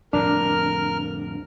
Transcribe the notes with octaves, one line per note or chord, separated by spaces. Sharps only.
F2 A2 D3 D4 A#4 F6